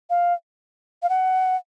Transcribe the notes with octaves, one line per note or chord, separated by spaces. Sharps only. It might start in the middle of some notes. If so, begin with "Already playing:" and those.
F5
F5
F#5